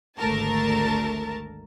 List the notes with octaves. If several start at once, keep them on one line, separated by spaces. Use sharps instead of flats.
G#1 D2 A3 A#4 A5